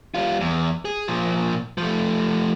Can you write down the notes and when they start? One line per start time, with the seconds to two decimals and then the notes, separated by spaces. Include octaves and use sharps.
0.15 G3 F4
0.41 E2
0.85 G#4
1.08 A#2 F3
1.78 F3 A3